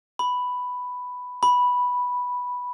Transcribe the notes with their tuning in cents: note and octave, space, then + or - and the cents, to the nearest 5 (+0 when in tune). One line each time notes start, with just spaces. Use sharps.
B5 +5
B5 -5